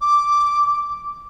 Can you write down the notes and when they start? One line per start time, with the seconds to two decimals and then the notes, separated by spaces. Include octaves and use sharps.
0.01 D6